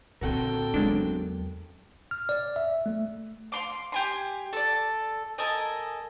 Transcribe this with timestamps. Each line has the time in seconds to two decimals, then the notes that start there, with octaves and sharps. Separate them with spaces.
0.21 A#2 D3 C4 F#4 A4 A#4 G5
0.74 E2 C#3 F#3 G#3 D4
2.11 F6
2.29 D5
2.56 E5
2.86 A3
3.52 F5 C6 D6
3.92 G4 G#5 C6
4.53 A4 D5
5.38 A4 A#4 D#5 G#5